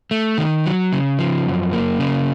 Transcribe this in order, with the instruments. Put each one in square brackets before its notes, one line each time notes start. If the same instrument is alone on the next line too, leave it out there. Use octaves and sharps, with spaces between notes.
[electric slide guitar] A3
D#3
F#3
C#3
F3
F#2
A#3
C#3